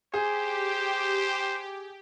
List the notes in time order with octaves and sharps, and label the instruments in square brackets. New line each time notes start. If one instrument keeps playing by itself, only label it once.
[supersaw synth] G4 [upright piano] G#4 [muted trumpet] C5